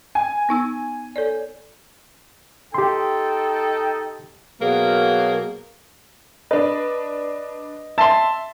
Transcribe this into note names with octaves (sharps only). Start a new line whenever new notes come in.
G#5
B3 D#4 E6
A4 C#5 D5
D#4 G4 A4 G5 C6
B2 F#3 A#3 G#4 A#4
D4 B4 D#5
E5 A5 C6